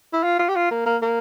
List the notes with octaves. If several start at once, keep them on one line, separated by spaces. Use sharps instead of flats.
E4
F4
F4
G4
F4
A#3
A#3
A#3